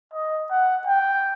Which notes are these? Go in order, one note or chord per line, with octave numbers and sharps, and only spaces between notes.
D#5
F#5
G5